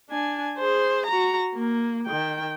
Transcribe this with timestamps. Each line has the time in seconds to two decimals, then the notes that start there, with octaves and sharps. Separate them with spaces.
0.11 D4 G#5
0.58 G#4 C5
1.07 F#4 A#5
1.55 A#3
2.06 D#3 G5